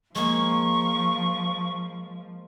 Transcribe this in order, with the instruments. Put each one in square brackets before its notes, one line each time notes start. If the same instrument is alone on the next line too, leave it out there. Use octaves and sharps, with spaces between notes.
[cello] F3 [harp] G#3 A#3 [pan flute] C#6